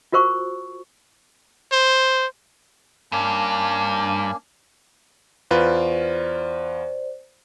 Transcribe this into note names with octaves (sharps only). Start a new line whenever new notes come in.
F4 F#4 A#4 C5 C#6
C5
G2 A#3 C#4 D4
E2 F4 B4 C5 D5